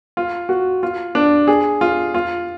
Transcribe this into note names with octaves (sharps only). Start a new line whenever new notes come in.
F4
F#4
F4
D4
G#4
F4
F4